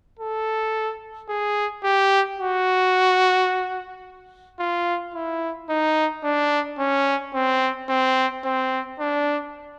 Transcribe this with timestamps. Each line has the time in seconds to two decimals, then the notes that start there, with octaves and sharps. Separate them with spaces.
0.19 A4
1.29 G#4
1.84 G4
2.39 F#4
4.59 F4
5.14 E4
5.69 D#4
6.23 D4
6.79 C#4
7.34 C4
7.89 C4
8.44 C4
9.00 D4